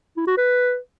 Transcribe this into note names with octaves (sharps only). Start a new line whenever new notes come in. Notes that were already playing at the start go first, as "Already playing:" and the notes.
E4
F#4
B4